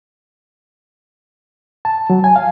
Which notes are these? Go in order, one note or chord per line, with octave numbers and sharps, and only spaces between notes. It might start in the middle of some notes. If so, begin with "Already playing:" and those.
A5
F#3
G#5
F5